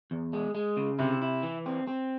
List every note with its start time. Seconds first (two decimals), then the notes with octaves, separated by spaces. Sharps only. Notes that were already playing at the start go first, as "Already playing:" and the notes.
0.11 E2
0.33 G#3
0.55 G#3
0.77 C#3
0.99 C3 E4
1.22 E4
1.43 E3
1.66 C4
1.88 C4